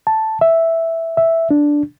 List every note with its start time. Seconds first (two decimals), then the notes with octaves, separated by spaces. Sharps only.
0.07 A5
0.41 E5
1.17 E5
1.51 D4